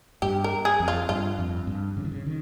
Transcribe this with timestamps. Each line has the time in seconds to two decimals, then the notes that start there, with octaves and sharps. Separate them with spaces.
0.22 G2 G4
0.44 A#4
0.65 G#4
0.80 F2
0.88 F4
1.09 G2 F4
1.39 F2
1.67 G2
1.97 C#3
2.05 D#3
2.12 C#3
2.26 D#3